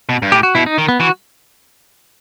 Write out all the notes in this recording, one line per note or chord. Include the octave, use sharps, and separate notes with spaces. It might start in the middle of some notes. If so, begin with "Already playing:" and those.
B2
G2
A2 G4
F#4
B2 E4
D#4
D#3
B3
E3 F#4